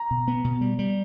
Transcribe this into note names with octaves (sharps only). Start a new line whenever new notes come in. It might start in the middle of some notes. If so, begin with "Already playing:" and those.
Already playing: A#5
B2
B3
B2
G3
G3